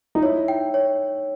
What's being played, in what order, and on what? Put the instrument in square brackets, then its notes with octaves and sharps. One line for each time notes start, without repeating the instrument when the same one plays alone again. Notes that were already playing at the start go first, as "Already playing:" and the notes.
[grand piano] D#4
[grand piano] E4 [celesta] C#5
[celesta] G5
C#5